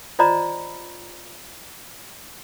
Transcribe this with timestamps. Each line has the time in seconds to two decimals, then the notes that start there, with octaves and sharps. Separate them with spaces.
0.19 F4 C5 D5 D#5 A#5 B5